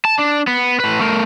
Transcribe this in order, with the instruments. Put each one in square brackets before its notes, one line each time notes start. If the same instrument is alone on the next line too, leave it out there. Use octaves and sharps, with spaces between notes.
[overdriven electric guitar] A5
D4
B3
A2 B4
A3 A#4